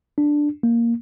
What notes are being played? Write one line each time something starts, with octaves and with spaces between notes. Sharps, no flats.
D4
A#3